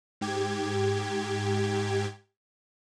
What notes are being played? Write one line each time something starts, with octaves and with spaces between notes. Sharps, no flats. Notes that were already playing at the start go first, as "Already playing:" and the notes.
G#2 G4 G#6